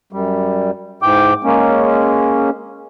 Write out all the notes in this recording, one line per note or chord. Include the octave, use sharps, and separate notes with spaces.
F#2 G3
G#2 E3 G5 D6
G#3 A#3 C#4